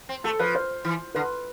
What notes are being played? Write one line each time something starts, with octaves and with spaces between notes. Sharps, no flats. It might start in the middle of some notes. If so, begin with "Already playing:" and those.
C4
A3 A4
F3 B4
C5
E3
D3 B4